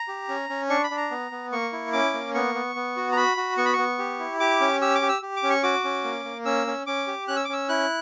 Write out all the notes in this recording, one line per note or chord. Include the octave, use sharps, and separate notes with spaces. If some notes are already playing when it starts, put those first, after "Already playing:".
Already playing: A#5
G4
C#4
C#4
D4 C#6
B5
D4
A#5
B3
B3
A#3 C#6
E4
C#4 D6
A#3
B3 C#6
B3
B3
F#4
A#5
F#4 B5
F#4
B3 C#6
B5
C#6
B3
G4
E4
G4 D6
C#4
G4 E6
D6
G4
E6
G4
D6
C#4
C#6
F#4 D6
C#4
A#3
A#3
C#4 E6
C#4
C#4 D6
G4
C#4 F#6
E6
D6
C#4 E6
E4 F#6